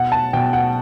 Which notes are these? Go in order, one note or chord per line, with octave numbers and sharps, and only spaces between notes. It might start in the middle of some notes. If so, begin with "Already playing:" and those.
Already playing: B2 F#5
A5
B2 G5
F#5